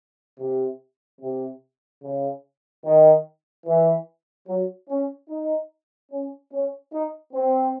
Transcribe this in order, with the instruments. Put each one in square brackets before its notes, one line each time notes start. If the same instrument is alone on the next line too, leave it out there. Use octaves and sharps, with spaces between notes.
[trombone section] C3
C3
C#3
D#3
E3
F#3
C#4
D#4
C#4
C#4
D#4
C4